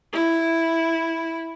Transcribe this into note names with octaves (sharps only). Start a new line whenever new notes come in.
E4